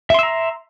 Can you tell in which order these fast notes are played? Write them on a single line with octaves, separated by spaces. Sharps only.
E5 C6 E6 A#5